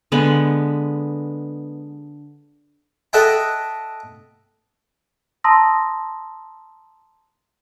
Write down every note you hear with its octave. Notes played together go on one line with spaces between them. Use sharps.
D3 G#3 B3 B5
A4 D#5 E5 F#5 G5
A5 A#5 C6 D#6 E6 A#6